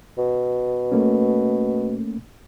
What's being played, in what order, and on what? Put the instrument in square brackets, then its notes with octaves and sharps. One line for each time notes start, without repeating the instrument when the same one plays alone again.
[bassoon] B2
[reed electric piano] A3 A#3 C#4